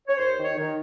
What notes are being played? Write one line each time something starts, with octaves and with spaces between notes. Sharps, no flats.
C#5
D#2 C5
D#3
C#5
D#3